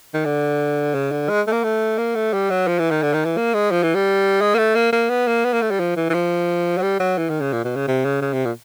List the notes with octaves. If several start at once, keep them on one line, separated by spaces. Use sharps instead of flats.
D#3
D3
C#3
D3
G#3
A3
A#3
A3
A#3
A3
G3
F#3
F3
E3
D#3
D3
D#3
E3
A#3
G#3
F3
E3
G3
G#3
A#3
A3
A#3
A#3
B3
A#3
B3
A#3
A3
G3
F3
E3
E3
F3
F#3
G3
F#3
E3
D#3
C#3
A#2
B2
C#3
C3
C#3
C#3
C3
A#2